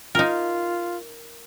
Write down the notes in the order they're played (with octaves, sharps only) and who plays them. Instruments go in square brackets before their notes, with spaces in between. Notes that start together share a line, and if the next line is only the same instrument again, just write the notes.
[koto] D#4 A#4 [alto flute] F4